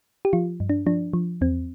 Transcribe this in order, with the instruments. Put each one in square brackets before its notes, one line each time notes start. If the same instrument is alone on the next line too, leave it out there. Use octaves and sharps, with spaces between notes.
[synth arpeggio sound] G4
F3 F4
G2
D4
F3 D4
F3
E2 C4